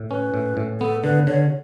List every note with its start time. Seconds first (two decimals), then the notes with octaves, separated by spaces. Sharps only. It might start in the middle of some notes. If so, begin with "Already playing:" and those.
Already playing: A2
0.10 C#4 B4
0.34 A2
0.57 A2
0.80 B3 A4
1.03 D3 B4
1.27 D3 C#5